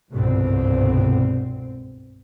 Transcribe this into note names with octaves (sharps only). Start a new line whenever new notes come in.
G1 C2 G#2 B2 D3 C4